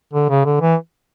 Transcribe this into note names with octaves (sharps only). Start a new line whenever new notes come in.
D3
C#3
D3
E3